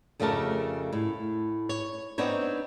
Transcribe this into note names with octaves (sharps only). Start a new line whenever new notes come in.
F2 C#3 A3 G4 A#4 A5
A2
C#5
B3 C4 D4 D#4 C#5